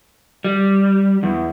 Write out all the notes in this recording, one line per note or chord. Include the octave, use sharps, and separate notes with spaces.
G3
E2